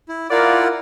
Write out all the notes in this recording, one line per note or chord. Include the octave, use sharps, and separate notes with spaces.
E4
E4 F4 A#4 D5 F5 F#5